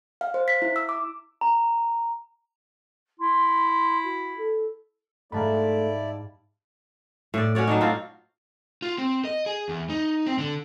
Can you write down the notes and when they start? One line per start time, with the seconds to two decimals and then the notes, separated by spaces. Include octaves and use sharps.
0.21 F5
0.34 C5
0.48 B6
0.62 E4
0.76 E6
0.89 D6
1.41 A#5
3.19 E4 C6
4.04 F#4
4.38 A4
5.32 G#2 G3 A3 E4 D5 F5 A5 B5
7.34 A2 D5
7.55 C#4 F#4 C#5 D5
7.67 F#3 D4 D#4
7.81 C4 D4 F4
8.82 F4
8.98 C4
9.25 D#5
9.46 G#4
9.69 E2
9.89 D#4
10.27 C4
10.38 D3